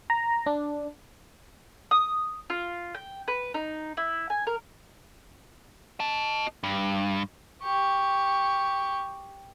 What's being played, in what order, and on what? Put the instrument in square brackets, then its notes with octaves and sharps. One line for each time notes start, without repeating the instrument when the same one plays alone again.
[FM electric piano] A#5
D4
[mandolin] D#6
F4
G5
B4
D#4
E4
G#5
A#4
[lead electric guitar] D#5 A5
G2
[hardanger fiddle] G4 C#6